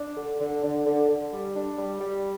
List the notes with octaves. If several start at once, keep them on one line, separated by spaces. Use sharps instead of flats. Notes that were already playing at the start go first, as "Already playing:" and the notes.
Already playing: D4
D3
D3
D3
D3
D3
G3
D4
G3
G3